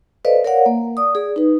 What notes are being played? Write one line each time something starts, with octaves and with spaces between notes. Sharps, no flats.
A4 B4 C5 D5 D#5 F5
A#4 C#5 D5 F5 F#5
A#3
D5 D#6
G#4 D5
D#4 B4